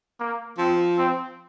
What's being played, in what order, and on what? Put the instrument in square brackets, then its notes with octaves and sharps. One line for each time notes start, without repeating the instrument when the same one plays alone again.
[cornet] A#3
[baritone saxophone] F3 [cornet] C4
[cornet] C4